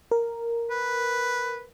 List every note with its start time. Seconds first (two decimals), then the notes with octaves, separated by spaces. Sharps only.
0.11 A#4
0.71 B4